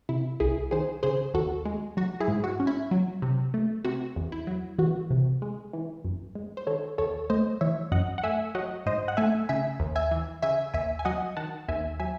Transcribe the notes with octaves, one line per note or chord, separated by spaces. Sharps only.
C3 E4
C2 E4 G#4
D#3 G#4 C5
C#3 G#4 C5
D#2 F#4 A4
G#3
F#3 F#4
E4 G#4
G#2
F#4
C#4
E4
F#3
C3
A3
C3 F#4
E2
E4
F#3
E3 F#4
C3
G#3
E3
F#2
G#3
C5
D#3 A4 C#5
D#2 A4 C#5
A3 C5 D#5
E3 C#5 E5
F#2 D#5 F#5
F#5
A3 E5 G#5
F#3 D#5 F#5
G#2 C5 D#5
F#5
A3 E5 G#5
C#3 E5 G#5
D#2
E5 G#5
E3
C#3 E5 G#5
D#2 E5 G#5
G#5
F#3 D#5 F#5
D#3 F#5 A5
D#2 E5 G#5
F#3 E5 G#5